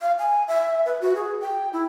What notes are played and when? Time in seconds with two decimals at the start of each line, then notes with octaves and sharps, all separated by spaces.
0.01 F5
0.19 G#5
0.48 E5
0.86 B4
1.01 F#4
1.15 G#4
1.41 G5
1.73 E4